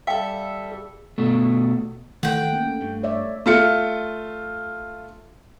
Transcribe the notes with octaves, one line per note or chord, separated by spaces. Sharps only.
G3 A4 E5 F5 G5
G#4
B2 A3
D#3 E3 A3 F#5 G5
A#3 C#4
G2 A3
C#5 D5 E5
A3 F4 C#7